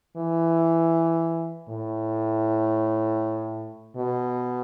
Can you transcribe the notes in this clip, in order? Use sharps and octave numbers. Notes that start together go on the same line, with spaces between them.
E3
A2
B2